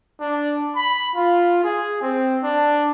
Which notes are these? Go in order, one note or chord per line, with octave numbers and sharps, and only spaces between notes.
D4
B5
F4
G#4
C4
D4